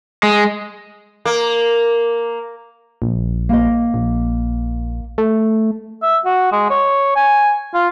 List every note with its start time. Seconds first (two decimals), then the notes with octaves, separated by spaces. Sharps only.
0.23 G#3
1.25 A#3
3.02 A#1
3.49 A#3 D#5
3.94 A#1
5.18 A3
6.02 E5
6.25 F#4
6.52 G#3
6.70 C#5
7.16 G#5
7.74 F4